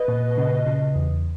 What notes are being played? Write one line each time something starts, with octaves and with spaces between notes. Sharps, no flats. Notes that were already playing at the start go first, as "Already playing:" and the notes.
Already playing: B4 D#5
A#2
C#3
C#3
E2